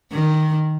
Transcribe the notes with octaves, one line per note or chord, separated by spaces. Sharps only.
D#3